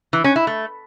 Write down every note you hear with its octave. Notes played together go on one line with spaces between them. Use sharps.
E3
C#4
E4
A3